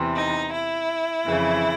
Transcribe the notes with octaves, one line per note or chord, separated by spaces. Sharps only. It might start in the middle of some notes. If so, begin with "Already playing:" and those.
Already playing: E2 C3 E3
D#4
E4
F2 C#3 E3